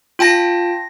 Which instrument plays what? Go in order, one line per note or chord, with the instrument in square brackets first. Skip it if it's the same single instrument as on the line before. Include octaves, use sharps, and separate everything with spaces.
[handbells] F4 G5 A5 A#6